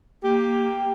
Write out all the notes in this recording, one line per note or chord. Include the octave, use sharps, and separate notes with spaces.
A#3 G4